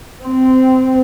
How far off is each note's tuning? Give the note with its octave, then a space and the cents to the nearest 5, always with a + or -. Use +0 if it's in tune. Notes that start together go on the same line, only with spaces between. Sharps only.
C4 -15